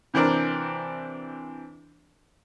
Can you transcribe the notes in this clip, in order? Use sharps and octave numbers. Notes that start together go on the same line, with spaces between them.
C3 E3 C4 D4 A#4